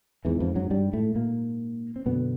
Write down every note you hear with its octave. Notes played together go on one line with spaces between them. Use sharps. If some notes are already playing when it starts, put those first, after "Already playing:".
E2 G#2 E3
F2 F3
F#2 F#3
G2 G3
A2 A3
A#2 A#3
C4
F#2 B2 D3 B3